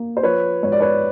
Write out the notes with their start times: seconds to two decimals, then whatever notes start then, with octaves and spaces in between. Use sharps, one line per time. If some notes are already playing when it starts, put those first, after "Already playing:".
Already playing: A#3
0.17 C5
0.23 F3 B4 C#5
0.63 G#2 C#5
0.72 D5
0.80 B4 C#5